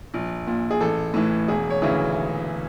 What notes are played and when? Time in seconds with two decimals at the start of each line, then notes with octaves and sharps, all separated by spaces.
0.14 A#1
0.47 A#2
0.71 G#4
0.80 A1 A4
1.14 A2 E3
1.48 E1 G#4
1.70 C#5
1.82 D2 C#3 E3